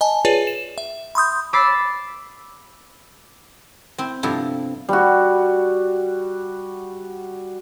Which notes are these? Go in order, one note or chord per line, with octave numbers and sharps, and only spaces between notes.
D#5 G#5 A5
F4 G#4 B4 C#5 D5
E7
E5
B5 C6 D#6 G6
B5 D6 E6 A6 B6 C7
C4 E4
G2 C3 F3 B3 E4 A4
G3 F#4